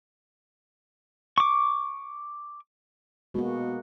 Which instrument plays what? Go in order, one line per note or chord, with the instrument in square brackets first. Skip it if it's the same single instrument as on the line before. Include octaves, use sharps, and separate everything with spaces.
[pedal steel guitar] C#6 D6
[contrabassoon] B2 [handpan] G#3 A#3 F#4